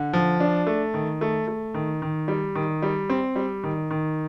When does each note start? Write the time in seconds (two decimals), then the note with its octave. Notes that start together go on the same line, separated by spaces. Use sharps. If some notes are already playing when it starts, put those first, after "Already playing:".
Already playing: D3
0.13 F3
0.40 D4
0.67 A3
0.94 D#3
1.21 A3
1.48 A3
1.74 D#3
2.02 D#3
2.28 G3
2.55 D#3
2.82 G3
3.10 C4
3.36 G3
3.63 D#3
3.90 D#3